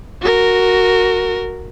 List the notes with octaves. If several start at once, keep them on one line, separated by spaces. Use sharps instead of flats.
F#4 A#4